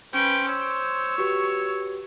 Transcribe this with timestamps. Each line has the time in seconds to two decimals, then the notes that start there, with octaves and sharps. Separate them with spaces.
0.14 C#4 B4 C5 G5
0.48 C#5 E6
1.18 F#4 G4 B4 C#6